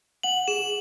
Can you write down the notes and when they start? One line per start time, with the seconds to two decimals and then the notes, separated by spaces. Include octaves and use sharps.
0.23 F#5 F#7
0.48 G#4 E7